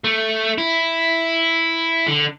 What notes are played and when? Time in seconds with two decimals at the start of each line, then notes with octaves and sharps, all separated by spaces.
0.04 A3
0.58 E4
2.07 D3